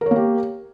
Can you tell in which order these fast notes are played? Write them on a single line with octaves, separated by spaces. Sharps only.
A#4 C#5 A#3 G4